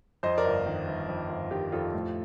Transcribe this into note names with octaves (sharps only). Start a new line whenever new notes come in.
F2 C5 D#5
A#4 D5
G1
D#3
G1
F2
G1
D#3 G4
F2 F4 A4
A2